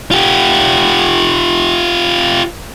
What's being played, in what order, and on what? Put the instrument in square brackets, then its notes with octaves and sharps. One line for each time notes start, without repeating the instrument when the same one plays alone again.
[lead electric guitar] F4 G4